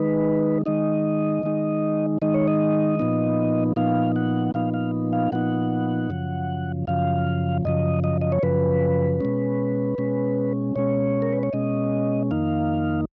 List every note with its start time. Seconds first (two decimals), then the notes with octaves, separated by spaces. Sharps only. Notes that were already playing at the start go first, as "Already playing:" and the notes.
Already playing: D#3 G#3 D#4 B4
0.66 D#3 G#3 D#4 D#5
1.43 D#3 G#3 D#4
2.22 D#3 G#3 D#4 D#5
2.34 C#5
2.48 D#5
2.99 A#2 F3 B3 D#4
3.76 A#2 F3 B3 D#4 F5
4.16 F#5
4.54 A#2 F3 B3 D#4 F5
4.74 F5
5.13 F5
5.32 A#2 F3 B3 D#4 F#5
6.10 F#2 C#3 F3
6.87 F#2 C#3 F3 F5
7.65 F#2 C#3 F3 D#5
8.04 D#5
8.21 D#5
8.32 C#5
8.43 F#2 C#3 F3 B4
9.21 B2 G#3 C#4
9.98 B2 G#3 C#4
10.76 B2 G#3 C#4 C#5
11.22 A#4
11.33 B4
11.43 C#5
11.53 B2 G#3 C#4 D#5
12.31 F2 D#3 A#3 D#4 F5